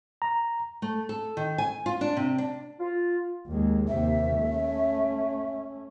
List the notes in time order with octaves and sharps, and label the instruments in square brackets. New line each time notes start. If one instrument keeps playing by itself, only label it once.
[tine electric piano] A#5
[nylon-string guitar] A3
A4
D#3
G#5
F4
D4
C3
D4
[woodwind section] F4
[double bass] D#2 G#3
[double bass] D#2 C3 [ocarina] E5
[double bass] A3 C#4